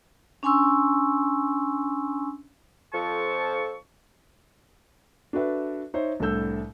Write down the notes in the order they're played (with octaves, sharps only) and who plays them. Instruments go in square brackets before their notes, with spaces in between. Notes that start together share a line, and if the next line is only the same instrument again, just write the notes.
[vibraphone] C#4 D4 G#5 C6 C#6 E6
[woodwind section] F2 F3 A4 A5 C#6
[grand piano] D4 F#4 A4 B4 E5
D#4 C5 C#5 E5
C2 A2 D4 A4 E6 G6